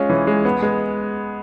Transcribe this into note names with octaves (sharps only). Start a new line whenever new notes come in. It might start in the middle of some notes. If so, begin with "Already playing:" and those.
Already playing: G#3 C#4 F4
E3
G#3
B3
G#3